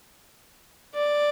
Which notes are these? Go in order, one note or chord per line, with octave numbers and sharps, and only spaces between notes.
D5